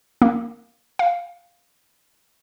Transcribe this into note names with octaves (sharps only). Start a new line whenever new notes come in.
A#3
F5